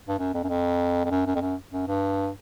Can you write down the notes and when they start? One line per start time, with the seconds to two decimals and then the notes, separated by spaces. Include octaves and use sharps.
0.08 G2
0.19 F#2
0.34 F2
0.44 F#2
0.49 F2
1.05 F2
1.11 F#2
1.26 F#2
1.35 F2
1.41 F#2
1.72 F#2
1.88 G2